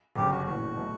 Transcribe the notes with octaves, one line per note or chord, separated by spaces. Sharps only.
G1 F#2 C#3 G4
F#4
A#1 A2 E3 F#4
B2 F#3 A3